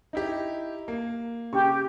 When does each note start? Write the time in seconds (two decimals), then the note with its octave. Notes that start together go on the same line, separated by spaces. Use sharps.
0.13 D#4 E4 G4
0.88 A#3
1.53 C#3 G4 C#6